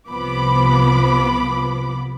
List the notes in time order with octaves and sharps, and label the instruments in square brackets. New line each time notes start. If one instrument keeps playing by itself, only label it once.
[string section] C2 F3 B3 B5 D6